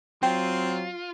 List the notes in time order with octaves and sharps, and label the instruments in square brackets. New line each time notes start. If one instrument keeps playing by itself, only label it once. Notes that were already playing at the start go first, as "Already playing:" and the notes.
[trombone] F#3 [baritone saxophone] C4 [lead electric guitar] F4 [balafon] G5